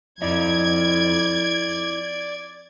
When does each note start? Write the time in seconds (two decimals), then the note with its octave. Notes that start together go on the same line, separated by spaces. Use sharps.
0.22 F2 E4 D5 D#5 G#6